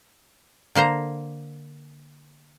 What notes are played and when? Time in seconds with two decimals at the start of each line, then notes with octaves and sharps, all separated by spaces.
0.75 D3 A#3 C5 A#5